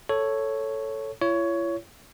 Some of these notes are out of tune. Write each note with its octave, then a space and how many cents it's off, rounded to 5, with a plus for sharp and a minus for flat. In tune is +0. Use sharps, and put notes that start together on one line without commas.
A4 +5 C#5 +0
E4 +45 C#5 +15